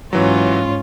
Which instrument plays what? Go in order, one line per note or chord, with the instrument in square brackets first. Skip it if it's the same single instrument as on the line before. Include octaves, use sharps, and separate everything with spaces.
[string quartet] G#2 C#4 F4 [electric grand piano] E3 F#3